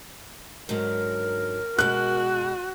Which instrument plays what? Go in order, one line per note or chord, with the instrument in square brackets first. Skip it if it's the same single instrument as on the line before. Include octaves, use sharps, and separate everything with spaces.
[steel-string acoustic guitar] G#2 D3 F#3 [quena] A#4
[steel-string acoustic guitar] B2 G#3 [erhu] F#4 [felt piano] F#6